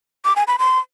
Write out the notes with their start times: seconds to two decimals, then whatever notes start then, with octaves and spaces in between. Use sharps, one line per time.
0.25 D6
0.36 G#5
0.47 B5
0.59 C6